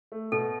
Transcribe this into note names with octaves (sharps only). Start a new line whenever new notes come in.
A3
B2 A4